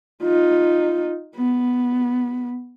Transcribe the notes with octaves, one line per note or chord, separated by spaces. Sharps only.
D#4 F4
B3